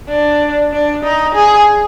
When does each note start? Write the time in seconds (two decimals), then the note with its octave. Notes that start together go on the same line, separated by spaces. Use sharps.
0.08 D4
0.72 D4
1.03 D#4
1.35 G#4